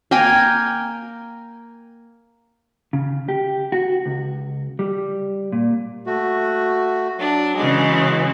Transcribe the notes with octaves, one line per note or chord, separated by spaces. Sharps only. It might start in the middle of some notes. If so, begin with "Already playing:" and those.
A#3 A#4 G5 G#5
C#3
G4
F#4
C#2
G3
A#2
A3 F#4
F#3 D4
C#3 E3 G#3